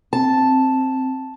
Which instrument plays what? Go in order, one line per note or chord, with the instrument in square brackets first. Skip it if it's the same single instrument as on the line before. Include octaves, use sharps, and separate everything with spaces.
[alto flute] C4 [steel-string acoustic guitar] A5